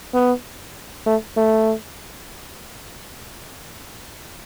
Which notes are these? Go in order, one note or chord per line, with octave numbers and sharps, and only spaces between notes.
B3
A3
A3